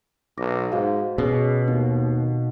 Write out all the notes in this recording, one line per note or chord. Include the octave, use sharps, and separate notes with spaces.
B1 D6 A#6
G#2 F#4 C5 F5
B2 C#4 G#4
D#2 B3 C4 D#4